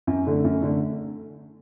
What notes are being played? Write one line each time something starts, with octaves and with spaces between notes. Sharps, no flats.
F#2
D3 A3
F#2
D3 A3